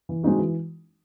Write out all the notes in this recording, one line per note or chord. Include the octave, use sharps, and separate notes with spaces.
E3
G#3 C4 D#4 F#4
E3